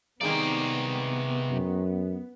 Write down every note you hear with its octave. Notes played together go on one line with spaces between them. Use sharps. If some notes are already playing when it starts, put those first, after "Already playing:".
C3 D#3 G#3 A#3 B3 D5
F#2